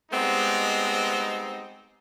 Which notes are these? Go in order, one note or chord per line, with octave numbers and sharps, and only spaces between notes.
G3 G#3 B3 C4 D#4